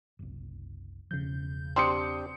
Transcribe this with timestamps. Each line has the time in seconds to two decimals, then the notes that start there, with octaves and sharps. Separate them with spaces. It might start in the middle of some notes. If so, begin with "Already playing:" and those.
0.19 F#1 C2
1.11 E1 C2 C#3 F3 G6
1.76 C4 D4 G4 C6 D#6 C#7